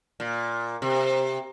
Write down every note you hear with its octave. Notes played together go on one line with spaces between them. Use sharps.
A#2
C3